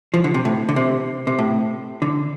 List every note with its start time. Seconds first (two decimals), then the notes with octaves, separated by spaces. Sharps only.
0.14 F3
0.24 D3
0.34 C3
0.45 A2
0.69 D3
0.76 C3
1.27 C3
1.39 A2
2.02 D3